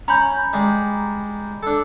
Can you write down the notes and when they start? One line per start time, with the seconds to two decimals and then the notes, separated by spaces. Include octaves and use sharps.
0.08 C#4 A#5 B5 G6
0.53 G3 G#3
1.63 D4 A4